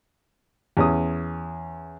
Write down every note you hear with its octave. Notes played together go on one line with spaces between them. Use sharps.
E2 C#4 D#6